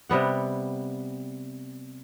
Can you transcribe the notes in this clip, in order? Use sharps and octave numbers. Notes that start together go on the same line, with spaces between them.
C3 G3 B3 F#5